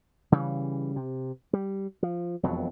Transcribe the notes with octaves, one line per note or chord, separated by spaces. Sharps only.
C#3 E3 G3
C3
G3
F3
E1 F2 B2 F#3